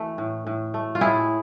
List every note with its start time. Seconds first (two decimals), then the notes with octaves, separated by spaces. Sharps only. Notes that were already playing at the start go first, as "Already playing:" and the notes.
Already playing: E3 A3
0.18 A2
0.47 A2
0.74 A3
0.95 F4
1.01 A2 E4 G#4